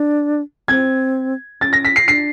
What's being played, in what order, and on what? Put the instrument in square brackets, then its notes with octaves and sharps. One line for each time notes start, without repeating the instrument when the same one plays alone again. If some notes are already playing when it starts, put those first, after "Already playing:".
Already playing: [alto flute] D4
[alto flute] C4 [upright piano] G#6
[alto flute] C#4 [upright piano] A6
[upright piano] A#6
B6
C7
[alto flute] D4 [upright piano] C7